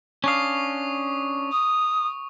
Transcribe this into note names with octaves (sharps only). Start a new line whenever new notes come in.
C#4 D4 F5 C#6 D#6
D#6